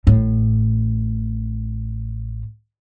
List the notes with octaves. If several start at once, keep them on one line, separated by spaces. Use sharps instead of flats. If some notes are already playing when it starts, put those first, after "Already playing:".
A1 A2